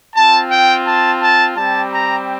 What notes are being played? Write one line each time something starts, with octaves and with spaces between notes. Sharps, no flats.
C4 F4 A5
G5
A5
A5
G3 C4 G4 A5
A#5